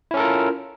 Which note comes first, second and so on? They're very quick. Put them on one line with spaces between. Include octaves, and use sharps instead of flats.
E4 C#4 A4 A#4 F4